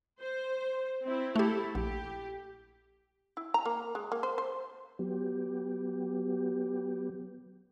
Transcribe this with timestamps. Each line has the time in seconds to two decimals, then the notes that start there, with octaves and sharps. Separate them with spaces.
0.21 C5
1.04 C4 E4
1.36 A3 E4 G4 A4
1.75 A#1 G4
3.37 E4
3.54 A#5
3.65 A#3
3.95 G#3
4.12 A#3
4.23 C5
4.38 C5
4.99 F#3 B3 G4